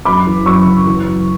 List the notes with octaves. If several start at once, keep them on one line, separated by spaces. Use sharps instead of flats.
F#2 B5 D6
E3
F#2 C#6 E6
C#3
E3
F#2